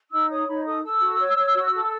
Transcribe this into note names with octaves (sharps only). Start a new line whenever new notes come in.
D#4 E6
C#5 D#6
D#4 B5
A4 D#6
A4 E6
F#4
C#5
C#5
F#4
A4